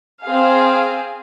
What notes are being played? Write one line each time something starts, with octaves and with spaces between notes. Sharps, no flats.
C4 G#4 F5